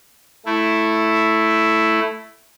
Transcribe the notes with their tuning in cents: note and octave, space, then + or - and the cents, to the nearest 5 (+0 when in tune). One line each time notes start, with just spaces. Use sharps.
A3 +0 E4 +0